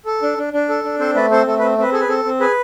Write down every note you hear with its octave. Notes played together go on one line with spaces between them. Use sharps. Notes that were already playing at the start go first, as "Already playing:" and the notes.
A4
D4
D4
D4
A4
D4
C4 A4 C5
A3 B4 D5
C4 A4 C5
A3 A4
C4 B4
C4 B4
G#4 A4
B4
C4 A4
C4
G#4 B4